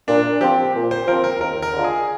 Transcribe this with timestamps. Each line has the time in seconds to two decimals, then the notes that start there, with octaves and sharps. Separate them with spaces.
0.08 A#2 D4
0.41 F3 C4 G4
0.75 A#2
0.91 C5
1.07 F3 C4 A#4
1.24 A#4
1.40 D#2 A#4
1.62 A#4
1.73 D3 G#3 D4 F4
1.84 G#4